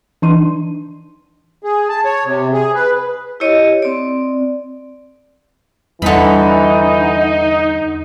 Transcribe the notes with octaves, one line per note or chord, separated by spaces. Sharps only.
E3 D4 D#4 C6 D#7
G#4
A5
C#5
C3
G#4
B4
E4 G4 C#5 D#5
C4 D5
E2 D3 E3 G3 D#4 B5